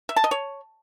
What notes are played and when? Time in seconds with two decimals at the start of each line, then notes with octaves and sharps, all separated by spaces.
0.09 E5
0.16 A5
0.24 D#5
0.31 C#5